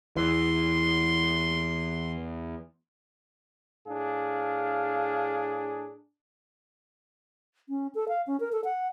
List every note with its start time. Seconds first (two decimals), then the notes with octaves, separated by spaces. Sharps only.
0.17 E2 E3 C6
3.88 A2 D4 G#4 F5
7.69 C#4
7.95 A4
8.08 F5
8.27 C#4
8.40 A#4
8.52 A4
8.64 F#5